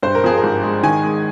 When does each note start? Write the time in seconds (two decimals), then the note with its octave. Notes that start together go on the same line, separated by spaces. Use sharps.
0.03 G2 C5
0.15 A#4
0.24 F3 G#4
0.38 A#4
0.44 G#1
0.63 G#3
0.83 D#3 G#5
1.03 G#3